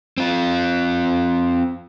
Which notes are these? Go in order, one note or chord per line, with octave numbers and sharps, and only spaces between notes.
C4 F4